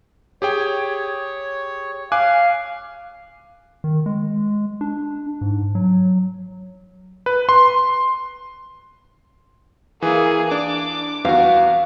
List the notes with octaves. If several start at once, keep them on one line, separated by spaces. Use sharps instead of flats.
G4 G#4 C#5 G5
F5 G#5 D6 F#6
D#3
G#3
D4
G#2
F#3
B4
C6
E3 A#3 G#4
D4 D6
E2 F#4 F5